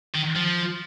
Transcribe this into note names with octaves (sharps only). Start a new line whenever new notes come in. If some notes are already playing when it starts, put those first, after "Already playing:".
D#3
F3